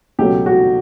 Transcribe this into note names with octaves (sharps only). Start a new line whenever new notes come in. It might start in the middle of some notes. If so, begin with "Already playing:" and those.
C#2 B2 F#3 A3 G4
F#4